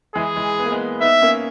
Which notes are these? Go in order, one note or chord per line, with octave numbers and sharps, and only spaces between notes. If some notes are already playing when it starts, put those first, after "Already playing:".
E3 G#3 G#4
E3 G#3
B3
A#3
G#3 B3
B3 D#4 E5
A#3 C#4